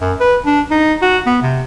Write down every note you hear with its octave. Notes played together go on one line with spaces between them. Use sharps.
F#2
B4
D4
D#4
F#4
B3
C3